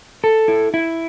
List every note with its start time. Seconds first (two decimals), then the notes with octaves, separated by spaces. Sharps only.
0.24 A4
0.48 E4
0.74 E4